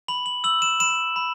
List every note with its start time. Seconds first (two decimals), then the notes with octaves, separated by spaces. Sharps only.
0.08 B5 F#7
0.26 F#7
0.44 E6 F#7
0.62 E7
0.80 B5 E7
1.16 B5